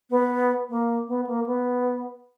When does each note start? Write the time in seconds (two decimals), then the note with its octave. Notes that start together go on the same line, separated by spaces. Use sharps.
0.10 B3
0.69 A#3
1.08 B3
1.27 A#3
1.46 B3